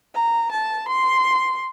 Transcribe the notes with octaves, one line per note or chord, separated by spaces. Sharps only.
A#5
A5
C6